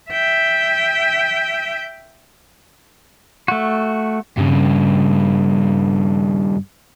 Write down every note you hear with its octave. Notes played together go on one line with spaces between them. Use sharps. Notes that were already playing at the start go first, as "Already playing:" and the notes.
E5 G5
A3 F#4
G2 C#3